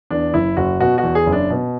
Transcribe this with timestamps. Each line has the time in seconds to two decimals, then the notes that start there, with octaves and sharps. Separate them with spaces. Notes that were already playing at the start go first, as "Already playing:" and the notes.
0.10 E2 D4
0.34 F#1 E4
0.57 F#1 F#4
0.80 B2 F#4
0.98 F#4
1.03 E2
1.15 G#4
1.26 F#1
1.32 D4
1.50 B2